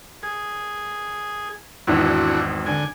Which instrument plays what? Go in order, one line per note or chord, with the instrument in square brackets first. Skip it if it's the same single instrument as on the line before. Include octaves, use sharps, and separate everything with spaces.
[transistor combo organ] G#4
[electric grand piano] G#1 E2 G#2 [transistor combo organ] D4 E4 F#4
[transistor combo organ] D3 G#5